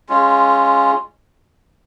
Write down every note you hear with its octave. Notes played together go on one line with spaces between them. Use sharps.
G#3 C#4 F4